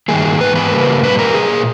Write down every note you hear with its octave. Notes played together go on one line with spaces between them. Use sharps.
G2 D#3 G3 A#3 G#4
G#2 E3 B3 B4
B4
C#3 G3 A#3
A#2 G3 A#3 B4
A#4
A#2 A#3 G#4